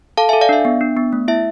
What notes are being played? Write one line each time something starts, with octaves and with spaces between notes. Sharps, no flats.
A4 F5 A5
A4 E5 G#5
D5 F5
D4 E5
B3
D4
B3
A3
E4 E5